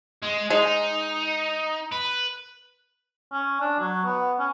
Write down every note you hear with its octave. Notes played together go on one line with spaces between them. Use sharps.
G#3
G#3 D#4
B4
C#4
D4
F#3
B3
C#4